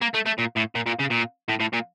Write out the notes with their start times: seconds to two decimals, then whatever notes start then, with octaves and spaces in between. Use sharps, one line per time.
0.01 A#3
0.14 A3
0.26 A3
0.38 A#2
0.56 A2
0.75 A#2
0.87 A#2
1.00 C#3
1.11 A#2
1.49 A2
1.60 A2
1.73 A#2